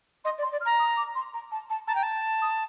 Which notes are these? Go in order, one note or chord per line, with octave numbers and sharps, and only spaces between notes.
D#5 C6
D5
C6
D5
F6
A#5
D#6
D6
C6
A#5
A5
A5
A5 A#5
G5
A5
D#6